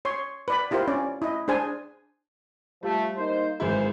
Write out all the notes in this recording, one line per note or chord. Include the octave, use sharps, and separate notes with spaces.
C#5 C6
B4 D5 B5
E4 F4 G4 A#4 C5
C#4 D5
E4 D#5
D4 G#4 C5 G#5
F3 G3 A3
A#3 D#4 C5
G#1 E3 E4 G#4 C5